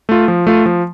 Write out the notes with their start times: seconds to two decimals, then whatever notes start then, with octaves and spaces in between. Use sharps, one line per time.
0.09 A3 F4
0.28 F3
0.47 A3 F4
0.66 F3